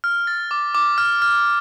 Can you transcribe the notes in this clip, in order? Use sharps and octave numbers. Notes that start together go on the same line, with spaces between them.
F6
A6
D6
D6
F6
F6